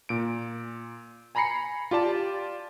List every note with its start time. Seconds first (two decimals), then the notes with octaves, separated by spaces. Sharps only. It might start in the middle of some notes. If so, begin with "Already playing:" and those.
0.09 A#2 D7
1.35 G#5 A#5 B5 A#6 C7 C#7
1.91 F4 G4 D5 A5